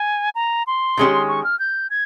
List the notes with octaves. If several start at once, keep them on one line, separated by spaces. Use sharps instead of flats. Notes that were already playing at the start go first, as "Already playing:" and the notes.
Already playing: G#5
A#5
C6
D#3 G#3 C#4 G4
C#6
F6
G6
G#6